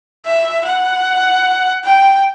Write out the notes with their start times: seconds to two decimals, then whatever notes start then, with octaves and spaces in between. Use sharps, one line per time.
0.25 E5
0.65 F#5
1.84 G5